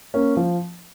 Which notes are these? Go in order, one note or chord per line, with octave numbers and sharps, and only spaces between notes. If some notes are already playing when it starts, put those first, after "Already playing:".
A#3 C#4
F3